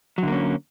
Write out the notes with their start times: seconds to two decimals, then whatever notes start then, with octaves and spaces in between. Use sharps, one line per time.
0.18 F#3
0.23 D3
0.28 A#3
0.32 C#4